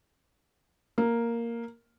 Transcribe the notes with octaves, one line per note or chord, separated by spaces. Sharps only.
A#3